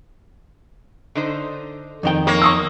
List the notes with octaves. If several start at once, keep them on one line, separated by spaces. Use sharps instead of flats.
D3 D#4 C5
F2 D#3 G5
A#3 C#5
C#6 D#6 E6